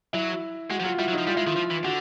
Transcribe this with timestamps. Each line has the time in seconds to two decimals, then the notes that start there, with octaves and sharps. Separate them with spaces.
0.13 F#3 E4
0.70 G#3 F#4
0.80 F3
0.84 F#3 F4
0.99 G3 E4
1.08 F#3
1.13 F3 D#4
1.27 G3 F4
1.36 G#3 E4
1.46 D#3 F4
1.56 F3
1.70 E3
1.84 D3 F#4